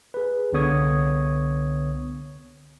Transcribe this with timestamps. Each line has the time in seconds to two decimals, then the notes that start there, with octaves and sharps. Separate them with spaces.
0.14 G#4 B4
0.53 C2 D3 B3 C#5 D#6 G#6